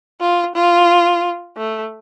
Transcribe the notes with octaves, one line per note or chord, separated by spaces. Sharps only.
F4
F4
A3